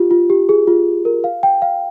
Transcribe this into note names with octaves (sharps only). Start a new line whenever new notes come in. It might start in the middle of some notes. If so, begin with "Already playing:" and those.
Already playing: F4 G4
F4
G4
G#4
F4
A#4
F5
G5
F5